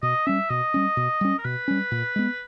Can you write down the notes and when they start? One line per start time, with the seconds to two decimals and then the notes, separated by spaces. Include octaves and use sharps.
0.02 B2 D#5
0.27 G3 C#4 E5
0.50 B2 D#5
0.74 G3 C#4
0.97 B2
1.21 G3 C#4
1.38 A#4
1.45 B2 B4
1.68 G3 C#4
1.91 A#2
2.16 G#3 B3